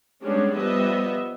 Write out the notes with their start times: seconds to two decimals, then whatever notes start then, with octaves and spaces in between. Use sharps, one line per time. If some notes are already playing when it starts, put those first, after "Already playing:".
0.22 G3 G#3 B3 C#4 D4 G4
0.57 F3 G3 B3 B4 D#5 E5